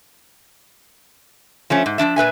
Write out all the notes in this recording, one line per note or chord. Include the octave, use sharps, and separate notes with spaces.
F3 A3 C#4
G#2
F3 G3 D4 E5
A#2 B4 E5 G#5